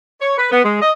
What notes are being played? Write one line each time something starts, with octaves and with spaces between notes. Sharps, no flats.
C#5
B4
B3
G#3
D#5